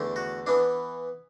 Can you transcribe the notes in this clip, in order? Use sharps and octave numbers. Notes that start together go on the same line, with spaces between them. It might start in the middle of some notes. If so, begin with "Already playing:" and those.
Already playing: E2 D3 A3
F#4
E3 B3 D4